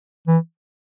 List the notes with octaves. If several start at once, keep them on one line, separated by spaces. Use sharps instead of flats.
E3